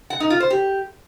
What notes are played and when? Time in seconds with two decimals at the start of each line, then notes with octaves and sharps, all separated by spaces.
0.10 F#5
0.20 D#4
0.30 F4
0.40 C5
0.50 G4